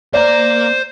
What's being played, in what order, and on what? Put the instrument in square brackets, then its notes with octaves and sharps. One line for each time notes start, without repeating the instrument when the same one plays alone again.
[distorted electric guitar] A#3 A#5 [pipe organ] C5 [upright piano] D5